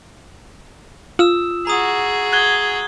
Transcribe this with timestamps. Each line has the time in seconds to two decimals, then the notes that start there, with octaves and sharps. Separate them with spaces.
1.19 F4 D#6 E6 E7
1.67 F#4 G#4 A#5 D#6
2.33 F#6 G#6 G7